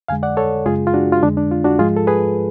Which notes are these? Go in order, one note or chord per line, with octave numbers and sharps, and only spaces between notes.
F2 D3 G#3 F5 G#5
D5 F#5
A4 C#5
F#2 C#3 G#3 F4 G#4
F4
D4 F#4
F4
F2 D3 G#3 D4
D4
F4
D4 F#4
G#2 F3 G#3 F4 G#4
A4
G#4 B4